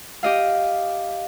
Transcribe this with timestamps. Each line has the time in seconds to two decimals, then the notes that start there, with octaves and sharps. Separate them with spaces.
0.23 G4 D#5 F5